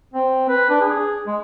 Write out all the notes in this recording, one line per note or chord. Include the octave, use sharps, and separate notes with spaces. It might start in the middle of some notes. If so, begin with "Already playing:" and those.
C4
B4
D4
G#4
G#3